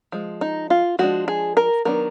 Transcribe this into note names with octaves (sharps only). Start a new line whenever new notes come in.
F3 G#3
D#4
F4
F3 G#3 D4 F#4
G#4
A#4
D#3 F#3 B3 D4 A#4